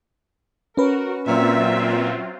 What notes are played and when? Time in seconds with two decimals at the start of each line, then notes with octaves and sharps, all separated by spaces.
0.77 C#4 F#4 A#4 B4
1.27 A#2 F#3 C4 F4 E5